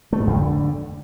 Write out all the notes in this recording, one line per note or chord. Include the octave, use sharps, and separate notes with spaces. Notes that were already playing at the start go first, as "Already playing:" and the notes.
A3
G#2
F2
D3